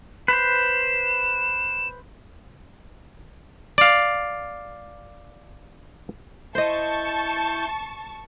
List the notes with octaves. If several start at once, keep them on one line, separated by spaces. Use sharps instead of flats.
B4 C5 E7
D5 F5
E4 C5 D#5 A5 C#6 G6